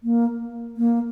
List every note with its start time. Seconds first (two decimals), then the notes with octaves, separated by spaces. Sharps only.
0.03 A#3
0.77 A#3